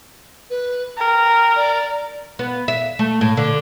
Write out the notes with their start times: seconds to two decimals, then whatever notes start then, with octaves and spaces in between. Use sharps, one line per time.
0.50 B4
0.98 A#4 G5
1.56 D5
2.39 B3
2.68 E5
2.99 A3
3.21 A2
3.37 D3